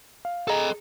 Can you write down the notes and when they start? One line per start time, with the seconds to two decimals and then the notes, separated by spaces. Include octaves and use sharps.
0.25 F5
0.48 G#4 A4 D#5 A#5